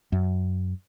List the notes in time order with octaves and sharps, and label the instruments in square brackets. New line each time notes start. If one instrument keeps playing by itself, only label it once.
[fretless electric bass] F#2